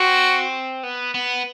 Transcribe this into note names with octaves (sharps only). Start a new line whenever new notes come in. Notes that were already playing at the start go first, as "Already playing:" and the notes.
Already playing: C4 F#4
B3
B3